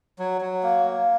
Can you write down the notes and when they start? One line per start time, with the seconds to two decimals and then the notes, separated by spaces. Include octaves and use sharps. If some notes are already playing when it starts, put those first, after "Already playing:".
0.19 F#3
0.41 F#3
0.63 A#3
0.86 A#3